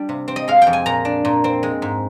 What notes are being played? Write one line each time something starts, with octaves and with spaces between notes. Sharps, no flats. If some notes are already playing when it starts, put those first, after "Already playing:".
Already playing: G3 D4 G5
C3
C4
D#5
G#3 F5
G5
F2
G#5
A#2 A#5
D4
A#2
C4
G#3
G#2